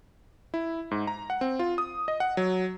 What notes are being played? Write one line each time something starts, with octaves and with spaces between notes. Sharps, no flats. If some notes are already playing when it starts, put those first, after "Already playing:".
E4
G#2
A#5
F#5
C4
F4
D#6
D#5
F#5
F#3